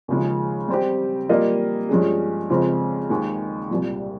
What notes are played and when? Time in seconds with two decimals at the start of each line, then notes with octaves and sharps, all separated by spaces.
0.08 D#2 C#3 F3 G#3
0.69 G3 C4 G4
1.29 G3 A#3 F4 A#4 D#5
1.89 G2 F3 G#3 C#4 G#4
2.49 F2 C#3 G#3 C4 F4
3.10 D#2 D#3 G#3
3.71 C2 A#2 G3